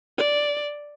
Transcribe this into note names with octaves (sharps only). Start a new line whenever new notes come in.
D5